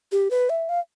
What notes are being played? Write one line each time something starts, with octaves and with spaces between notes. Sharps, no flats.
G4
B4
E5
F5